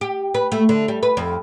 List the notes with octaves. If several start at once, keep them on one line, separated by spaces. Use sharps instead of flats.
G4
B4
A3
D3
G3
B4
F2